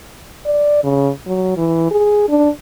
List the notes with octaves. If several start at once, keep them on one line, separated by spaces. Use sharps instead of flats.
D5
C#3
F#3
E3
G#4
D4